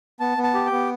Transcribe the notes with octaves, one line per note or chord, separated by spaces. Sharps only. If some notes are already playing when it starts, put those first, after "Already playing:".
B3 A5
B3
A5
G4
G5
B3